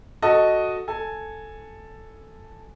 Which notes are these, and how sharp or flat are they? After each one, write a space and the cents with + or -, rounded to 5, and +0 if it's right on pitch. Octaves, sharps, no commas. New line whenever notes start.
F#4 +0 A4 +0 D#5 +0
A4 +0 G#5 +0